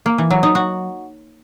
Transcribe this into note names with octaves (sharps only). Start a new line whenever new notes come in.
A#3
E3
F#3
D#4
F#4